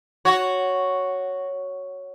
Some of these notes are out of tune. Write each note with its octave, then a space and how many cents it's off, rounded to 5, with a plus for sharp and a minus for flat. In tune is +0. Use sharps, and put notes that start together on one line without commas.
F#4 +0 C#5 +0